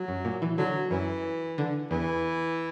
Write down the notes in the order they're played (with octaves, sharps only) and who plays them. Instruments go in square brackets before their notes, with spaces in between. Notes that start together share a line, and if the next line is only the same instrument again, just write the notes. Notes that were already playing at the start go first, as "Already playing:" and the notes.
Already playing: [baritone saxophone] F#3
[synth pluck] F#2
A#2
E3
[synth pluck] D3 [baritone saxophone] F#3
[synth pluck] F#2 [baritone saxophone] E3
[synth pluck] D3
[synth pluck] E2 [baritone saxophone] E3